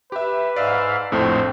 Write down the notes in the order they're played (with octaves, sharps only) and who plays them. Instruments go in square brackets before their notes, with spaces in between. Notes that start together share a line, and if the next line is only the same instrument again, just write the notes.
[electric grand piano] G4 E5 [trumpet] B4
[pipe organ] G#2 E5 F5 [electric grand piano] D5
[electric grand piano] A#1 F2 A2 [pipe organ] A3 C5 [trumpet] C4